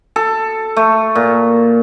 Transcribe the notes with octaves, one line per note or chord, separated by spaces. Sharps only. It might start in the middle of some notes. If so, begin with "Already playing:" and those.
A4
A3
A#2